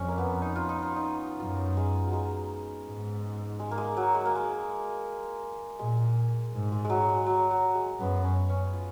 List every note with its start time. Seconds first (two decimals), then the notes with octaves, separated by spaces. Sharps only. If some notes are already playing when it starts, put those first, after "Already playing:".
Already playing: F2 C#4
0.08 A#3
0.18 B3
0.42 D#4
0.56 F4
0.69 D#4
0.82 F4
0.96 D#4
1.40 F#2 F4
1.77 G#3
2.07 F#3
2.13 G#3
2.87 G#2
3.60 G#3
3.71 A#3
3.78 G#3
3.97 F#3
4.15 G#3
4.26 A#3
4.35 G#3
5.79 A#2 G#3
6.54 G#2
6.72 G#3
6.85 G#3
6.90 F#3
7.09 G#3
7.26 F#3
7.51 F#3
7.75 G#3
8.00 F#2 B3
8.24 C#4
8.49 C#4
8.73 F4